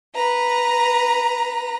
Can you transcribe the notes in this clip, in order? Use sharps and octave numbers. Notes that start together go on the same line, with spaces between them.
B4 A#5